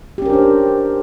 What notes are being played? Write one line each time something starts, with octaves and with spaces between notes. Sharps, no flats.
C#4 D4 G4 A#4 C5